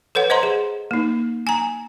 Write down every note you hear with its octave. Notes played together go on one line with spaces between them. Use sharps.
A4 B4 C#5 F#5
C5 D#5 F#5 A#5 C6
G#4
A#3 D#4
G#5 A#5